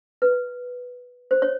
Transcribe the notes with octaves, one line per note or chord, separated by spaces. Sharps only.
B4
C5
C#5